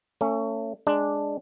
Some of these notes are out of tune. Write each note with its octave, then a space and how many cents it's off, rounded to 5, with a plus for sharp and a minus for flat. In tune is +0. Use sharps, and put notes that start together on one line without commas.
A3 +30 C#4 +0
G#3 +0 D4 +0